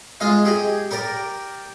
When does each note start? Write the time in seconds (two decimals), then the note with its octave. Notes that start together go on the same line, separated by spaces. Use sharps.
0.20 G#3 F4 D#5 F5
0.45 G4 G#4 D#5
0.91 G4 A#4 D5 A#5